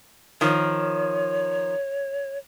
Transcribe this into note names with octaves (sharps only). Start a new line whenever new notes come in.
D#3 F3 C#5